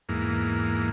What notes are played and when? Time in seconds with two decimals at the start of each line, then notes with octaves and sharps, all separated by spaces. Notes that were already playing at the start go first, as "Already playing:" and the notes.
0.09 E2 G#2 A#3